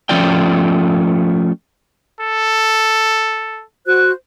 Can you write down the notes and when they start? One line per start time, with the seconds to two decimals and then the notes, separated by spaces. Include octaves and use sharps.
0.09 F3 A3 C#4 F4 D5 G5
2.20 A4
3.86 F#4 C5 F#6